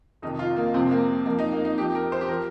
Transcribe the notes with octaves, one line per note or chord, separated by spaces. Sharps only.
F2 C3 D#3 D#4
F4
A#3
F2 C3 F3 C4
A#3
F2 F3 A#3
D#4
A#3
D#4
F2 F3 G4
A#4
C5
G4
F3 A#4